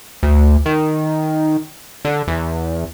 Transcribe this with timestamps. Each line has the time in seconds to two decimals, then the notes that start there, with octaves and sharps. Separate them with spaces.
0.23 D2
0.66 D#3
2.05 D3
2.27 E2